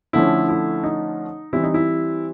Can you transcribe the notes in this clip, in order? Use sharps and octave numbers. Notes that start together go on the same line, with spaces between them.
D3 F3 A3 C#4 E4
E4
D#4
E3 G3 C4 E4
D#4
E4